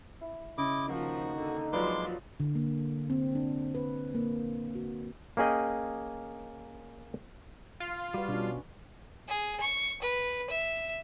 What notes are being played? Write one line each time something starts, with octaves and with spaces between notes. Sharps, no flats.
E4
C#3 E4 D#5 D6
D#3 F3 A#3 D#4 F#4
D3
F3 F#3 G#3 B4 D5 C6 D6
D3
A#3
C4
D4
B4
A#3
F#4
A#3 C#4 G#4 D#5 G5
F4
G3 F#4 B4
B2 C#4 D4
G#4
C#6
B4
E5